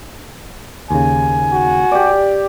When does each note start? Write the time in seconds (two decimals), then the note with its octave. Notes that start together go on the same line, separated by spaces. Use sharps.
0.91 D#2 C#3 G#5
1.52 F#4
1.92 G4 D5